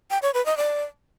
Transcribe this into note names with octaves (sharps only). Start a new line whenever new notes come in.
G5
C#5
B4
D#5
D5